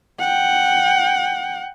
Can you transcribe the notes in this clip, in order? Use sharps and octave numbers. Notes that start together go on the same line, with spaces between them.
F#5 G5